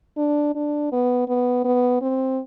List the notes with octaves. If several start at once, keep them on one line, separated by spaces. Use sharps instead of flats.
D4
D4
B3
B3
B3
C4